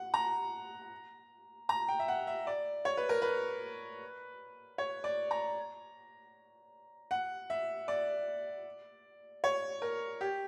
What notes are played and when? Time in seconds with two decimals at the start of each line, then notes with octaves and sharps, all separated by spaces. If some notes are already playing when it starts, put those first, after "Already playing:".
Already playing: F#5
0.14 A#5
1.69 A#5
1.88 G5
1.99 E5
2.08 F#5
2.27 E5
2.47 D5
2.85 C#5
2.97 B4
3.09 A#4
3.22 B4
4.78 C#5
5.04 D5
5.31 A#5
7.11 F#5
7.50 E5
7.88 D5
9.44 C#5
9.82 A#4
10.21 G4